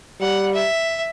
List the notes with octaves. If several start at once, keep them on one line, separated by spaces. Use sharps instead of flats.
G3 F#5
E5